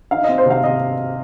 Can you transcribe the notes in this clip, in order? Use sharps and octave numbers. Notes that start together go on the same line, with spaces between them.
D#4 F5
D#5
C4
C5
C3 F5
C3 D#5